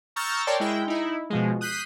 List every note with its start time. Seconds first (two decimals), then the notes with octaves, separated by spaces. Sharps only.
0.16 A#5 C#6 E6 F6 G6 A6
0.47 A#4 C#5 D5 G5 A5 C6
0.60 G#3 E4 G5
0.87 D#4 E4
1.30 B2 F3 G#3
1.61 D#6 F#6 G6 B6 C7 D#7